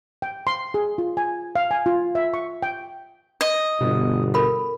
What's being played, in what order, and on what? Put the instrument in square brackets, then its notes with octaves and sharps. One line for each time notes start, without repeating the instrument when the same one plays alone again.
[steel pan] G5
C6
G#4
F4
G#5
F5
G#5
F4
E5
C#6
G5
[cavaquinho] D#5
[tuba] G1 [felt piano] B2
[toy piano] A4 A#4 B5